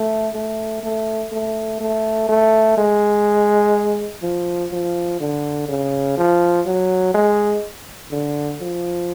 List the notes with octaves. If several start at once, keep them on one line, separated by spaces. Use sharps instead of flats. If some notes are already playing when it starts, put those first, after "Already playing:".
Already playing: A3
A3
A3
A3
A3
A3
G#3
F3
F3
D3
C#3
F3
F#3
G#3
D3
F3